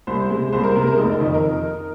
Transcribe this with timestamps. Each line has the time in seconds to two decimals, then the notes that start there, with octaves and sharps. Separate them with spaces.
0.07 C2 C5
0.30 C3 G#3
0.52 C2 C5
0.63 A#4
0.75 C3 G#3 A#4
0.87 A#4
0.98 F1 D#4
1.20 F2 D#3 D#4
1.34 A#4